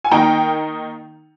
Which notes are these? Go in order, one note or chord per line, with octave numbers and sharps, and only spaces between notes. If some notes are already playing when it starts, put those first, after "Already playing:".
G#5
D#3 A#3 D#4 G5 A#5